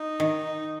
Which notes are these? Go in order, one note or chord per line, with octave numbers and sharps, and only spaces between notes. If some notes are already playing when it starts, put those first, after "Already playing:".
Already playing: D#4
D#3